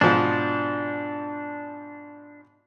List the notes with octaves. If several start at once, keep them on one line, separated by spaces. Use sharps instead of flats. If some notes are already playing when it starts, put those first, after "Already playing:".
G#2 B2 F3 D4